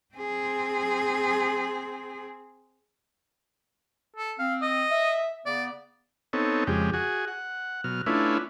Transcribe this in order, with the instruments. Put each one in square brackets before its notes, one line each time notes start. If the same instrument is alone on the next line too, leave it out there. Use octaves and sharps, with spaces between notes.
[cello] C4 G#4
[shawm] A4
[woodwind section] C4 [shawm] F5
[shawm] D#5
[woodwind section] E5
[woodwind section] C#3 B3 [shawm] D5
[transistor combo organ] B3 C4 D#4 A4 C#5
F2 C#3 G#3 G4
F#4 G#4
F#5
B2 F#3 F6
A3 C#4 D4 E4 F4 B4